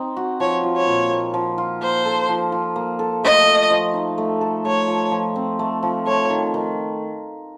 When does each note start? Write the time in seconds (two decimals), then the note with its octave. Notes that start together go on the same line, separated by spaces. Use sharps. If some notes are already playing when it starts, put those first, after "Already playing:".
Already playing: C4 D#4
0.17 F#4
0.40 F3 C#5
0.63 F4
0.76 C#5
0.87 A#2
1.11 A#3
1.34 F3
1.58 F4
1.82 A#3 C5
2.05 A4
2.29 F3
2.52 F4
2.76 A#3
2.99 A4
3.23 A3 D#5
3.47 A4
3.70 F3
3.94 D#4
4.18 A3
4.41 A4
4.65 A3 C#5
4.88 F3
5.12 F3
5.36 C4
5.59 A3
5.83 F3
6.06 A3 C#5
6.30 D#3
6.54 D#3